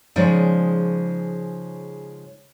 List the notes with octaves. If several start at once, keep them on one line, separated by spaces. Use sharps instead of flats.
C#3 F3 G#3 D#4 D5